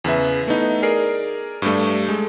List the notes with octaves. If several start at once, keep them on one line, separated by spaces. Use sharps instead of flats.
E2 C#3 B4 E5
A3 B3 D#4 E4
G#4 A#4 D5 C7
G2 G3 A3
G#3 A4